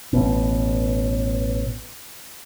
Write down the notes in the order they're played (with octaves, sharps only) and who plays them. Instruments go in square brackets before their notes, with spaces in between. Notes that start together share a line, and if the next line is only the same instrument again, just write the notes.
[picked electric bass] A1 B2